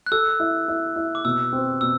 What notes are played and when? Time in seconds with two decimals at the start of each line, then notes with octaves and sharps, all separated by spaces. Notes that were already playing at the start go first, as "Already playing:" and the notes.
0.06 F#6
0.12 A4 E6
0.40 E4
0.68 E4
0.96 E4
1.15 D6
1.25 B2 E6
1.53 C4
1.81 B2 E6